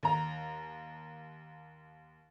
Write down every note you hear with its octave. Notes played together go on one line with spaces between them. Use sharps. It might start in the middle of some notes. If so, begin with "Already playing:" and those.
D#2 A#5